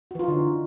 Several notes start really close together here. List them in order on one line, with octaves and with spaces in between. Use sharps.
F#4 E3 F4 D#4 D3